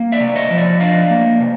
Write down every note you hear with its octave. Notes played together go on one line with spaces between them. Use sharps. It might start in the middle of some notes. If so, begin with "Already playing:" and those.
Already playing: A#3
D5 E5
C3
C#5 D#5
F3
D5 E5
D4 D#5 F5
A#3
C3